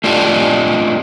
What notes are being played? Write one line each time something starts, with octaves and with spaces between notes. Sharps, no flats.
A3 D4 F4 G4 D#5